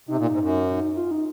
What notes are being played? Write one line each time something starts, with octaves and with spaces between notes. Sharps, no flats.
C3 D#4
A#2
G#2
F#2
F4
D#4